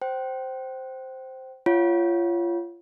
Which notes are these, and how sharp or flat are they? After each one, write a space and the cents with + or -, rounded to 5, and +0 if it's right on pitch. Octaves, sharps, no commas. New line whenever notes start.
C5 +0 G5 -25
F4 -25 C#5 +0 F#5 +0